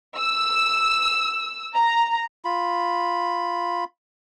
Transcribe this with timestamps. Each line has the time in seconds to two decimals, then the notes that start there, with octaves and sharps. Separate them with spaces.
0.18 E6
1.74 A#5
2.44 F4 B5